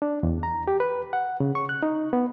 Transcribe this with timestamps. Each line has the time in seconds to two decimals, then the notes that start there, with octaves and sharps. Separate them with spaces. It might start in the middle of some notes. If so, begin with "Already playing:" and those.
0.02 D4
0.23 E2
0.43 A#5
0.68 G4
0.80 B4
1.13 F#5
1.40 C#3
1.55 C#6
1.69 F#6
1.83 D#4
2.13 B3